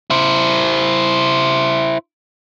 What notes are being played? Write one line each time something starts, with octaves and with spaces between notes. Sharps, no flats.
E4 C5